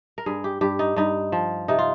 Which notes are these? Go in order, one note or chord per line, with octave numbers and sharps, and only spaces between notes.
A#4
G2 G#4
G4
G2 G4
D#4
G2 D#4
F3
C3 D#4
F4